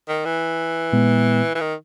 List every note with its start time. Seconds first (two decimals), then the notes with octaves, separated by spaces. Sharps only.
0.08 D#3
0.25 E3
0.93 A#2 G#3 B3
1.55 E3
1.60 D#3